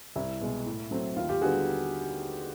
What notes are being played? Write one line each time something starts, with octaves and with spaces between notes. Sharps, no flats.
C2 E4
B2 G#3
A2
F#3 A3 C4
D#2 F4
F4 G4
D3 G3 B3 F#4 G#4